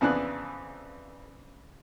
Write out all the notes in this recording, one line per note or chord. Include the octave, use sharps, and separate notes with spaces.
F2 C#3 E3 B3 D4 F#6